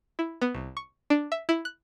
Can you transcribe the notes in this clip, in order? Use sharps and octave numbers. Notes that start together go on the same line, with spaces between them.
E4
B3
C2
C#6
D4
E5
E4
F#6